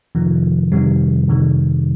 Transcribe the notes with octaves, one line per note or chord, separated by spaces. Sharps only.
F2 C3 D#3 F3
F2 C3 D#3 G3
F2 C3 D#3